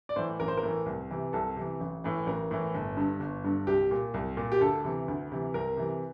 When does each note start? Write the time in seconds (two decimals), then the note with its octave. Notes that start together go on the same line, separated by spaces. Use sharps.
0.09 D5
0.16 A2 E3 C5
0.40 A1 A#4
0.48 C5
0.57 A#4
0.63 A2 E3
0.86 C2
1.11 C3 E3
1.33 C2 A4
1.56 C3 E3
1.81 A1
2.04 A2 E3
2.26 A1 A#4
2.51 A2 E3
2.74 G1
2.97 G2 D3
3.20 G1
3.44 G2 D3
3.67 C2 G4
3.91 A#2
4.14 C2
4.37 A#2
4.52 G4
4.61 D2 A4
4.85 C3 E3
5.08 D2
5.32 C3 E3
5.54 C2 A#4
5.77 C3 E3